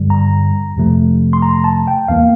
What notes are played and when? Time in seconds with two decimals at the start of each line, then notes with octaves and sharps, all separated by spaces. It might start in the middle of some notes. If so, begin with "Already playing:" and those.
Already playing: G2 D3 G3
0.10 A#5
0.76 F2 C3 F3 A3
1.33 C6
1.42 A#5
1.64 A5
1.87 G5
2.08 E2 E3 A#3 F5